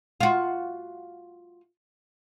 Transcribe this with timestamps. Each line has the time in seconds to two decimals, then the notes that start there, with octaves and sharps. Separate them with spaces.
0.20 F4 F#4